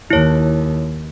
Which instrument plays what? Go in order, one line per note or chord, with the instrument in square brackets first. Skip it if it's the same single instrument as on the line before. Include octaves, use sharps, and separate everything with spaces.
[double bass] D#2 [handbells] E4 C#5